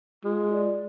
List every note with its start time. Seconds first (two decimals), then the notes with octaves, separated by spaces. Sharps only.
0.24 G#3 F4
0.53 D5